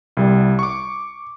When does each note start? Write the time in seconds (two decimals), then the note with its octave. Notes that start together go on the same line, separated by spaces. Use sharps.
0.17 C2 G3
0.59 C#6 D6